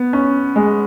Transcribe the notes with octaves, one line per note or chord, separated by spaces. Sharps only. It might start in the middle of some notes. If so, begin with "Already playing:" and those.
Already playing: B3
C#4
G#3